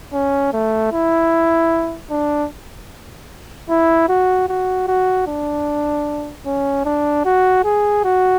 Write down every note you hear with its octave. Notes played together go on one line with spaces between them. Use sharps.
C#4
A3
E4
D4
E4
F#4
F#4
F#4
D4
C#4
D4
F#4
G#4
F#4